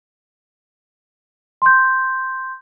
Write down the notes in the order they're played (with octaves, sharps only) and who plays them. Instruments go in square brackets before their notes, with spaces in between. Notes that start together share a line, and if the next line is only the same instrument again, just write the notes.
[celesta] C6 G6